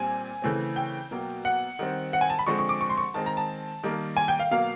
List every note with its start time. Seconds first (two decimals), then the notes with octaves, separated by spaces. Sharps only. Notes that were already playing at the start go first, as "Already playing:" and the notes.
Already playing: A#2 G3 C4 G#5
0.42 C#3 E3 A3 C4
0.76 G5
1.11 B2 F#3 A#3
1.45 F#5
1.79 D#3 G3 C4
2.13 F#5
2.21 G#5
2.30 A5
2.39 B5
2.47 D3 F3 G#3 C4 C#6
2.59 C#6
2.69 D6
2.81 C#6
2.89 C6
2.98 C#6
3.14 D#3 G#3 C4 A5
3.26 A#5
3.37 A5
3.83 D#3 G3 A#3
4.17 G#5
4.28 G5
4.39 F5
4.51 B2 F#3 A#3 F5